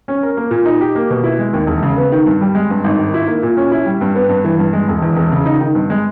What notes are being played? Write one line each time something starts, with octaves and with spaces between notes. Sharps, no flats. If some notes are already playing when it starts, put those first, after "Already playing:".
C#4
A#4
A#3
A#2
D#4
G4
A#3
B2
E4
G#3
D#2
E1
C#3
B3
D#3
G2
G3
G#3
G2
G#1
D#3
E4
A#3
A#2
C#4
E4
G3
G2
B3
G2
E3
G2
G#3
E1
E2
E1
C#3
D#4
D#3
G2
G#3